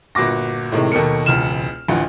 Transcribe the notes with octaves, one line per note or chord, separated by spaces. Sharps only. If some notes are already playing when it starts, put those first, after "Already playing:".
G1 A#2 F#4 D6 A#6
A2 C3 D#3 G#3
D#2 B2 A4 A#4 C#7
E1 C#2 F6 E7
A1 D2 F3 F#5